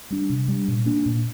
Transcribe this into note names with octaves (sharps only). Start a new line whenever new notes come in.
G3 D4
C3
G3 D4
A#2
A#3 D4
A#2